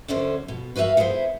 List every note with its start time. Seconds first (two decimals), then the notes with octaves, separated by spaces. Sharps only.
0.08 F#2 D3 C#4 C5
0.48 B2
0.76 F#4 B4 C5 E5 F5
0.97 G3 B3 E4 G#4 C5